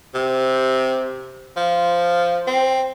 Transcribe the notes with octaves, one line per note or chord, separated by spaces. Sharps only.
C3
F3
C4